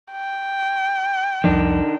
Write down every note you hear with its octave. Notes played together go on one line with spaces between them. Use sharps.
G5
C2 F2 D#3 F3 D4